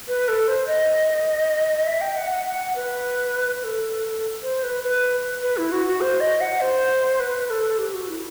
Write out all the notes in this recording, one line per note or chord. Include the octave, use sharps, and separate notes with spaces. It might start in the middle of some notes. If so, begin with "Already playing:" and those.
B4
A4
C5
D#5
E5
G5
F#5
F#5
F#5
B4
A4
C5
B4
B4
B4
E4
F#4
F#4
C5
D#5
F#5
C5
B4
A4
G4
F#4
E4